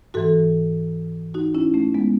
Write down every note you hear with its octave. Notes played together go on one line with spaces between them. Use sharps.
G#2 E3 F#4 A4
D#4 F#4
C#4 E4
A3 C#4
G#3 B3